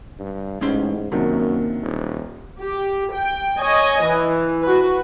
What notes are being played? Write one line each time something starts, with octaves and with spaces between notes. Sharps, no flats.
G2
A1 G#2 G#3 C#4 C6
F#2 C3 D#3 F#3 A#3 D4
D#1
G4
G5
C#5 D#5 G#5
E3
F#4 B4